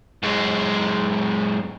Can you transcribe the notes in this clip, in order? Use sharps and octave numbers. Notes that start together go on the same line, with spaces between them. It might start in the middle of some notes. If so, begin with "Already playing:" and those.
F#2 G#3